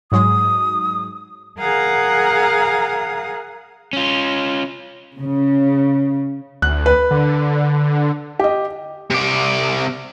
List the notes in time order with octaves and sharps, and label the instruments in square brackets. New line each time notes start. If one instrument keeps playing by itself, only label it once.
[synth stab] G#2 F#3 G#3 [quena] D#6
[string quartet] G#4 A#4 F5 F#5 A#5 D#6
[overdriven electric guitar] C#4 F4
[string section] C#3
[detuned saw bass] D2 [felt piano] F#6
[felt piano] B4
[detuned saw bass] D3
[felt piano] G4 D#5
[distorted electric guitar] C3 D5